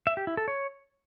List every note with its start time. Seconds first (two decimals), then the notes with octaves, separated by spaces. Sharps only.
0.07 E5
0.17 G4
0.27 E4
0.37 A4
0.48 C#5